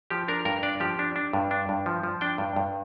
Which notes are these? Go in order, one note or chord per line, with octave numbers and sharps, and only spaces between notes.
F3 G4
D4 A#4
G2 A#4
D4 D5
F3 G4
D4
D4
G2
D4
G2
F3
F3
D4 G5
G2
G2